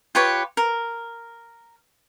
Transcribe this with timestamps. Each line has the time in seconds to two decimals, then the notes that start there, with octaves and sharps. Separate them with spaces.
0.15 F4 G4 B4 C#5
0.57 A#4